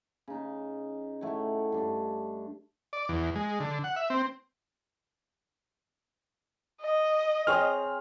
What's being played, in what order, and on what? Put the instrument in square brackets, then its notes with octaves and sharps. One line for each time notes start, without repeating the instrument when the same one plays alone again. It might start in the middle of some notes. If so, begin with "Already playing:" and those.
[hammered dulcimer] C#3 D#4
A2 A3 F#4 C#5
G2 D4
[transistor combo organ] D5
E2
G#3
D3
F#5
E5
C4
[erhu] D#5
[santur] C4 G#4 C#5 [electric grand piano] F6